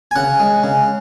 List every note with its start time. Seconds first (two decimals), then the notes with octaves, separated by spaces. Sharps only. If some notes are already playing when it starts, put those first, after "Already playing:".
0.11 G#5
0.16 C#3 F#5
0.40 G#3
0.64 C#3